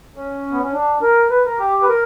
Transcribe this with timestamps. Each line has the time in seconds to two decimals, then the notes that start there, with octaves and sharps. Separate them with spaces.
0.16 C#4
0.52 B3
0.63 C#4
0.73 D4
1.02 A#4
1.30 B4
1.46 A#4
1.59 G4
1.83 B4
1.89 A#4